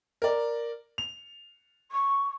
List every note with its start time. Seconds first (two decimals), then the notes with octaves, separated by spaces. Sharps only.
0.22 A#4 D5
0.98 F7
1.91 C#6